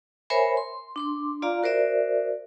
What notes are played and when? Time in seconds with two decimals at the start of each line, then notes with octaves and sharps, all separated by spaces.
0.30 A#4 C5 C#5 E5 G#5 B5
0.57 C6
0.96 D4 C6 D6
1.42 F4 D5 F5 A#5
1.63 F#4 A#4 C5 D5 E5